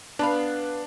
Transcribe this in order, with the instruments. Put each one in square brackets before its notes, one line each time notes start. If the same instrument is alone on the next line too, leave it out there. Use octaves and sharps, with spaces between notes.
[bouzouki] B3 B4 F5 [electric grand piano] D4 [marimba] A5 B5